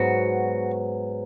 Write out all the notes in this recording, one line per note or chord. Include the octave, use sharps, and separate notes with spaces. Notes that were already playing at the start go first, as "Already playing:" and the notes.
Already playing: G#2 F#3 B3 F#4